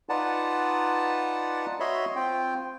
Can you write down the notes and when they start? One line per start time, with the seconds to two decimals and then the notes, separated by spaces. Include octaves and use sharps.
0.09 D#4 F4 B4 D5 F#5 A5
1.80 F#4 C#5 D#5 E5 B5 C6
2.16 C4 F4 G5